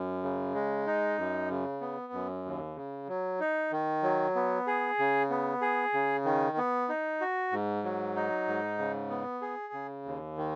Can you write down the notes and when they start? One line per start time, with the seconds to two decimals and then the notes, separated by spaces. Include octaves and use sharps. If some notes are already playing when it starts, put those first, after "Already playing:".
Already playing: F#2
0.23 C#3
0.55 G#3
0.87 D#4
1.18 F#2
1.50 C#3
1.81 B3
2.13 F#2
2.45 D#2
2.76 C#3
3.08 F#3
3.40 D#4
3.72 D#3
4.03 F#3
4.35 B3
4.67 G#4
4.99 C#3
5.30 B3
5.62 G#4
5.93 C#3
6.25 D#3
6.57 B3
6.89 D#4
7.21 F#4
7.52 G#2
7.84 F#3
8.16 D#4
8.47 G#2
8.78 C#3
9.10 B3
9.42 G#4
9.73 C#3
10.05 D#2
10.38 D#3